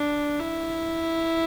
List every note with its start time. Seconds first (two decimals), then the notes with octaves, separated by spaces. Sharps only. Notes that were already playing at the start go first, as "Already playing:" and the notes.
Already playing: D4
0.40 E4